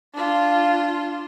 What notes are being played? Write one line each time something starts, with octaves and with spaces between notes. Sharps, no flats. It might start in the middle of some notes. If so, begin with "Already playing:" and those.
D4 F4